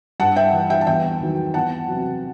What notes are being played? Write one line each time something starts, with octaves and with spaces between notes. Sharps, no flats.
G2 F#5 A5
E5 G5
E3
E5 G5
A5
E2 E5 G5
D#3 F#3
E2 F#5 A5
C3 F#3